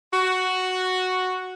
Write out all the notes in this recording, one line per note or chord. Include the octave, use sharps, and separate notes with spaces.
F#4